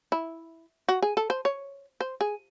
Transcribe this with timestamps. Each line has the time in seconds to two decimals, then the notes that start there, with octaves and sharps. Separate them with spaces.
0.12 E4
0.89 F#4
1.02 G#4
1.17 A4
1.30 C5
1.45 C#5
2.01 C5
2.21 G#4